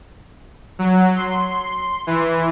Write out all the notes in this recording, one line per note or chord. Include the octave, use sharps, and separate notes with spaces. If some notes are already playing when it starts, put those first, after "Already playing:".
F#3
C6
E3